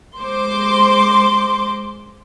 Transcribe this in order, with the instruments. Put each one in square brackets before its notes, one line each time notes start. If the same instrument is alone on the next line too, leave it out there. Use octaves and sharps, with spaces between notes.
[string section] G#3 C5 D6 [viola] C6